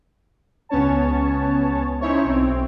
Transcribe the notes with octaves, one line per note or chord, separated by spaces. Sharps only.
C#2 B3 C#4 C#5 A5
C#4 D#4 E4 C5 C#5
B1 C4